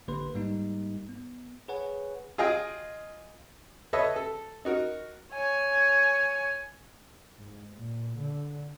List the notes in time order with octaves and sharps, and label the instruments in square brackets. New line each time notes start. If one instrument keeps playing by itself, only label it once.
[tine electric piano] A1 D3 A#3 B4 C6
G#2 G3 A#3 D#4
B3
G#4 B4 C#5 F#5 G#5
[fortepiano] F4 G#4 D#5 F5 G5
A4 B4 C#5 D#5 E5
A4
D#4 F#4 A#4
[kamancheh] C#5 G#5
[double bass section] G#2
A#2
D3